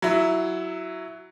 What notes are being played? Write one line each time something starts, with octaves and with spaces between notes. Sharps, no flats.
F#3 E4